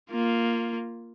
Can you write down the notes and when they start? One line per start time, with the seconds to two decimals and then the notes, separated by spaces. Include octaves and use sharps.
0.11 A#3 F4